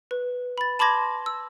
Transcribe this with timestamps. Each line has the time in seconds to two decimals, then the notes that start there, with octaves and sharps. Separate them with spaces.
0.11 B4
0.58 B5 A6
0.79 A5 B5 C6 D6 G#6 A#6
1.26 E6